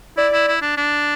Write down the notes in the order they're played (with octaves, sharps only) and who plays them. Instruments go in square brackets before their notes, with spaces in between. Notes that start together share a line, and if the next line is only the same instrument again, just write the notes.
[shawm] E4 [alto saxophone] D5
[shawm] E4
E4
D4
D4